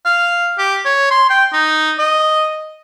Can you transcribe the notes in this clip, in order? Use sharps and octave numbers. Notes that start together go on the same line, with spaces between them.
F5
G4
C#5
C6
G5
D#4
D#5